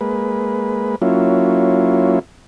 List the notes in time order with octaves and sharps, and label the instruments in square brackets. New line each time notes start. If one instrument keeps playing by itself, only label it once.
[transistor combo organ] G#3 A#3 B4
F#3 A#3 C#4 E4 F4